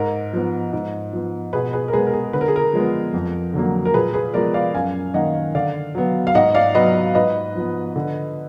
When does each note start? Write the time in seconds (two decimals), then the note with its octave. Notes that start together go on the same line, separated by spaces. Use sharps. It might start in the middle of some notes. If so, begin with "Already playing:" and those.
Already playing: G#2 A#4
0.33 F3 B3
0.73 G#2
1.13 F3 B3
1.53 B2 G#4 B4
1.73 G#4 B4
1.88 A#4
1.93 G#3 B3 G#4 B4
2.07 A#4
2.13 G#4
2.33 D3 B4
2.41 A#4
2.48 G#4
2.56 A#4
2.73 F3 G#3 B3
3.14 F2
3.54 D3 F#3 A#3
3.85 A#4
3.94 A#2 G#4 B4
4.14 G#4 B4
4.34 F3 G#3 B3 A#4 D5
4.54 D5 F5
4.74 F#2 F5 G#5
5.14 D#3 A#3 D#5 F#5
5.55 D3 D5 F5
5.95 F#3 B3
6.27 F5
6.35 G#2 D#5 F#5
6.55 D5 F5
6.75 F#3 B3 B4 D#5
7.15 G#2 B4 D#5
7.56 F3 B3
7.96 D3